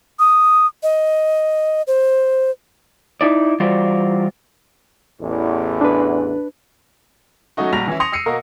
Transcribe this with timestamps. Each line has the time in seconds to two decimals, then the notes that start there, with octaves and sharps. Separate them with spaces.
0.19 D#6
0.83 D#5
1.87 C5
3.21 D#4 E4 D5
3.60 E3 G3 F4 F#4 C5 D5
5.20 A1 E2
5.81 D4 B4
7.57 F#3 A3 C#4 D#4 F#4
7.72 A#1 G3 F#4 A#5 A#6 F7
7.87 E3 C#4 E4
8.00 C6 D#6 A#6 C#7 F7
8.12 D#6 E6 C7 C#7 D#7
8.26 B2 A#3 F#4 A#4 D#5 D#6